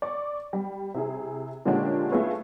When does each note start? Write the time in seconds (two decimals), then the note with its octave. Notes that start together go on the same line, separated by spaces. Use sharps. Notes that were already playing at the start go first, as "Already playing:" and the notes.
0.02 D5 C#6
0.53 G3
0.94 C3 E4 G#4
1.65 A#2 D3 G#3 C#4 D4 G4
2.11 A3 E4 F4 G#4 B4 C#5